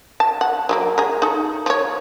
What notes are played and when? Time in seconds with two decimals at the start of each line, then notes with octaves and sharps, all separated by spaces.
0.20 A5
0.41 F#5
0.69 F#3 A3 A#3
0.98 G#4 A#4
1.22 D#4 A4
1.66 F3 C#5